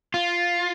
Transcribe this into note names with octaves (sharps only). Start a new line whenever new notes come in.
F4